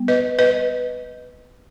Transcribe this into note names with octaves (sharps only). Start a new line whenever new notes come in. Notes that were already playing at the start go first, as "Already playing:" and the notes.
Already playing: G3 B3
B4 D#5
B4 D#5